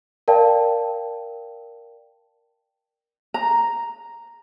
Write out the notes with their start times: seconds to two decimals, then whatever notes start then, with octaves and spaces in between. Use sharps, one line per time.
0.28 A#4 D5 F5 G5 A5
3.34 A#5